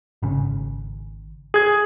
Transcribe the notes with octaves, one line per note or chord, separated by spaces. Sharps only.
G#1 C#3
G#4 G#6